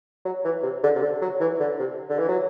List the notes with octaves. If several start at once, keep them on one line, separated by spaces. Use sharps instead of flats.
F#3
E3
C3
D3
C3
D3
F#3
E3
D3
C3
D3
E3
F#3